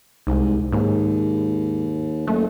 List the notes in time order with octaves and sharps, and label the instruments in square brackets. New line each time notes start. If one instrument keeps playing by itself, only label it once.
[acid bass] C2 [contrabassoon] G#2
[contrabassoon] D#2 [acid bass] G#2
[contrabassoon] F#1 [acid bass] A3